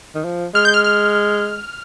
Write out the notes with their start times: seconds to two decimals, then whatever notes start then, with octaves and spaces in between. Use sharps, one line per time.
0.15 D#3
0.25 F3
0.54 G#3 F6
0.65 G6
0.74 F6
0.84 F6